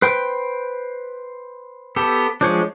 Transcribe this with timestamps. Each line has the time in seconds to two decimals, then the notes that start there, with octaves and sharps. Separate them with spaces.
0.02 B4 C5 G5
1.96 B3 G4 A4
2.41 F3 G#3 D4 C5 C#5